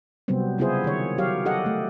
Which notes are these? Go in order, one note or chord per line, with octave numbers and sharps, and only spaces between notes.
C3 F#3 G3 B3 C4
C#3 B3 E4 F4 G#4 C5
D#3 C#5
F#3 G4 C#5 F5
G4 A4 D#5 F#5
A3